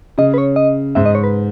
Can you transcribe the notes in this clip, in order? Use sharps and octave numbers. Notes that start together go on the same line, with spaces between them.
C#3 D#5
B4
C#5
D#5
G#2 E5
D#5
C#5
B4